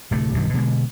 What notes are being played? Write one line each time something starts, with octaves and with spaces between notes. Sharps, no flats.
D1 C3 A3
B1 G2 D#3
B2 D3 F#3 G#3